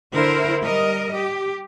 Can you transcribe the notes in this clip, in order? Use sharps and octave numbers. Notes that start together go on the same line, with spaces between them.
D3 E4 A#4 C5
G3 A#4 D#5
G4